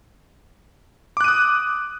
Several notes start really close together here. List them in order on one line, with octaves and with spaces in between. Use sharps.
D6 F#6 D#7 D#6